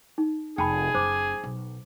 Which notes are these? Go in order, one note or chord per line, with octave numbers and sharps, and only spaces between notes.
D#4
F1 G#4 G5 A5 B5
F#1 C5 D6
B1